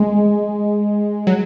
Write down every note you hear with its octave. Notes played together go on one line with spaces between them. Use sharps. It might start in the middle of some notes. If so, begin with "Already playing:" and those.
Already playing: G#3
F#3